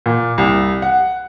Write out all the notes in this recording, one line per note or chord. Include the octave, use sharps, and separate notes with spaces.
A#2
C2
F#5